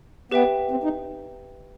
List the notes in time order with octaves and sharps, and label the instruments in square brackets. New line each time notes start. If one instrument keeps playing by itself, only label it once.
[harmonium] B3 [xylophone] G4 B4 E5 G5
[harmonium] C4
D#4